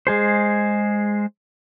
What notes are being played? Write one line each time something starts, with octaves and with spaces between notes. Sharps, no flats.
G#3 G#4 C5